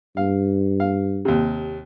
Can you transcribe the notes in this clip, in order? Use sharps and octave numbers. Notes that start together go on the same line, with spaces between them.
G2 F5
F5
D#2 C3